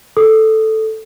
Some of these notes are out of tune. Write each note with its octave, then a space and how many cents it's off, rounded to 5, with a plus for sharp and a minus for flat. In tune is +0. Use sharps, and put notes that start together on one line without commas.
A4 +0 D#6 -10